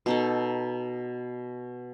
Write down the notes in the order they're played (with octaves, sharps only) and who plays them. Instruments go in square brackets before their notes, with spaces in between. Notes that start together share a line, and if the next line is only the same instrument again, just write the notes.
[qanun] B2 D#4 A4